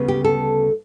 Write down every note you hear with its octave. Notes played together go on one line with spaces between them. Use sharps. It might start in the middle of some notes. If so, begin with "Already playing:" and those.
Already playing: D2 C#3 G3 B3
G4
A4